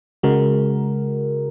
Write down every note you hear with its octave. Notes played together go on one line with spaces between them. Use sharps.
C#3 G#3 F#4 A#4